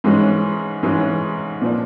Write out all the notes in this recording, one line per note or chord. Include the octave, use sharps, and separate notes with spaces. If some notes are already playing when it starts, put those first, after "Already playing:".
G#2 E3 G#3 C#4
G#2 E3 G#3 C#4
A#2 F3 A#3 D4